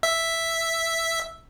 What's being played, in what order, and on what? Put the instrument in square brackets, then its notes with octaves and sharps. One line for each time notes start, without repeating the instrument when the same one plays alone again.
[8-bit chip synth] E5